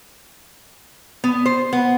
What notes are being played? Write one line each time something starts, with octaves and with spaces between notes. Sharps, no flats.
B3
C5
B3